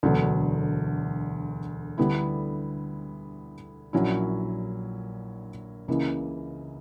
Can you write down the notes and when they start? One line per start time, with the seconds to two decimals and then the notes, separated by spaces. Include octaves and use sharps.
0.03 E1 D2 D3 F#3 B3
1.98 D2 D3 G3 B3 E4
3.93 A#1 A#2 F#3 C#4 E4
5.88 C#2 C#3 E3 A#3 E4